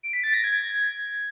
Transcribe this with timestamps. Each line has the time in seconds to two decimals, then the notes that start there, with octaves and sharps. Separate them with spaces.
0.03 D7
0.13 B6
0.24 A6
0.34 A#6
0.44 G#6